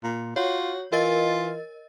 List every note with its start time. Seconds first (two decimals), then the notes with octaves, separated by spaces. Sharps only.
0.03 A#2
0.36 F4 F#4 C#5
0.92 E3 F4 A#4 D#5 A6